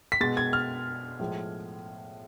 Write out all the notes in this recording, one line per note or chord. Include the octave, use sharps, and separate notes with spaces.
B6
B2 G#3 A6
G#6
F6
A2 F3 G#3